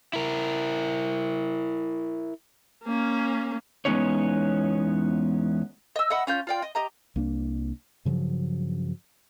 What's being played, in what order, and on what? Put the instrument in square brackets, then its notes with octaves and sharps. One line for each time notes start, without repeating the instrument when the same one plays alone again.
[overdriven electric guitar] E4 A#4
[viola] A#3 C#4
[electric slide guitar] E2 G#3 B3 C#4 D#4 C#5
[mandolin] D#5 E6
D#5 E5 F#5 B5
C#4 F4 G6
F4 D5 G5
D#5
G4 D#5 A#5
[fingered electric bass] C2 A#3 D4
G2 C#3 F3 F#3